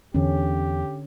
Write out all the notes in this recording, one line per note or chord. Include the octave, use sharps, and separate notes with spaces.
E2 D3 C#4 G4